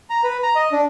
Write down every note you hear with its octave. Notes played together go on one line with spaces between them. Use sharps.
A#5
B4
A#5
D#5
D4